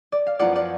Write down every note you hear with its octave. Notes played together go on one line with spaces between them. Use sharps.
D5
F5
F#2 F3 B3 F4 D5 F#5
D5 F#5